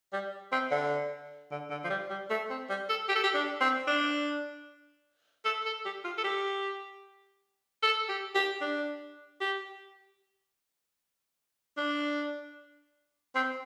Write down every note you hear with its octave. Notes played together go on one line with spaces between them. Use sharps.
G3
C4
D3
D3
D3
F3
G3
G3
A3
C4
G3
A4
G4
A4
G4
D4
C4
D4
A4
A4
G4
F4
A4
G4
A4
G4
G4
D4
G4
D4
C4